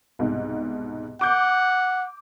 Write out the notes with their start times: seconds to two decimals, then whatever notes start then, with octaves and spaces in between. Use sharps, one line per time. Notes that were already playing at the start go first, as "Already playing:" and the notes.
0.19 C2 G#2 B2
1.21 F#5 D6 G6